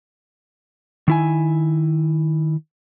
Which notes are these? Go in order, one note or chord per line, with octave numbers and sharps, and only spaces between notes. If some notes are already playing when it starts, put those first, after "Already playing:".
D#3 E4 G#5